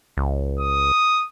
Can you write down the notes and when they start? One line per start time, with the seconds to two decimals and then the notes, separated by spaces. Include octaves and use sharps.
0.17 C#2
0.60 D#6